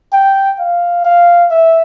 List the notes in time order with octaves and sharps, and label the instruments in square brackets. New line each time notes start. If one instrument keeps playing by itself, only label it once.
[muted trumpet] G5
F5
F5
E5